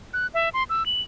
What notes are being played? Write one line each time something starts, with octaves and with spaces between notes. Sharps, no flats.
F#6
E5
C6
E6
F#7